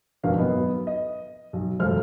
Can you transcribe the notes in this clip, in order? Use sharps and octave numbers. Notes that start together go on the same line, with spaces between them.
G#1 F2 B2 D4 A#4 F5
B1 B3 D#5
D#5
B1
E1 C#2 F#2 A4 C5 F6